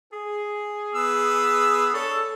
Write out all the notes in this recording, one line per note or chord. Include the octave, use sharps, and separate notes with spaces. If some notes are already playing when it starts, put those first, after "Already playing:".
G#4
B3 D#6 E6
D4 A4 C#5